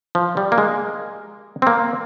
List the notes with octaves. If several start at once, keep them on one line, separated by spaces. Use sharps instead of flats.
F3
G3
A#3
G#3
C4
A#3